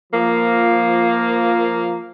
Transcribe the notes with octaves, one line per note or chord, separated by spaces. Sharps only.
F3 A#3